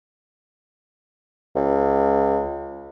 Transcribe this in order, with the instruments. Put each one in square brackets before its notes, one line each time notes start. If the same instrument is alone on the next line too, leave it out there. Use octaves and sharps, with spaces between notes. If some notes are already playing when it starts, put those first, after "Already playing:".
[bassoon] C#2